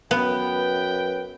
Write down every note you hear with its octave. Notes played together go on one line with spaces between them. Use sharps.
F#2 B3 B4 G5